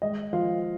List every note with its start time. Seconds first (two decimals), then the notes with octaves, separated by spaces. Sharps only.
0.02 G#3 D#5
0.33 F3 F4 F5